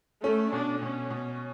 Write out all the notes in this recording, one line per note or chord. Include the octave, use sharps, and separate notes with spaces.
A3 C#4
B2 D4
B2 C#4
B2